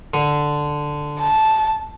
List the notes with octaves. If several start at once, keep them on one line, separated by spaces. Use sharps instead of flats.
D3
A5